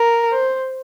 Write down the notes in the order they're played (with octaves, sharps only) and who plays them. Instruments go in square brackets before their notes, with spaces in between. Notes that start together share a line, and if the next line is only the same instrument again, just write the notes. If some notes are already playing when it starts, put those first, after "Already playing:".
Already playing: [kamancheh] A#4
[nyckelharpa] C5